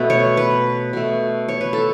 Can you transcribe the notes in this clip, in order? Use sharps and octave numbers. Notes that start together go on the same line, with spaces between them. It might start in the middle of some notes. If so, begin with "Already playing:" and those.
Already playing: B2 A3 B4
C#5
B4
B2 A3
C#5
B4
A4